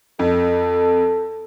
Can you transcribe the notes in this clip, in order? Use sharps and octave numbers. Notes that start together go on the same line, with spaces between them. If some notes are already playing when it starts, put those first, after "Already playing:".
F2 A4